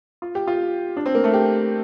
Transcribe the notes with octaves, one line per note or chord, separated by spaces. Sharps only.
F4
G4
F4
D4
C4
A#3
A3
G4